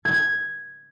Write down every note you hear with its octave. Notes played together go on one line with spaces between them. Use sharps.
G#6